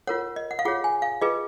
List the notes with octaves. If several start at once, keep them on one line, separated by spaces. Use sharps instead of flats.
F4 A#4 C#5 F#5
D#5
F#5
F5
F4 G#4 C#5 F#5
G#5
F5
F4 G#4 B4 D#5